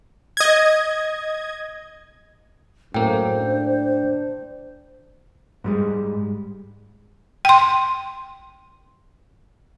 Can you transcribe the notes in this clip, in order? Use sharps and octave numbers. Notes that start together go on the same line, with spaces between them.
D#5 G#6
F#2 A2 A#3 C5 G5
D4
G#2 G3 G#3
G5 C6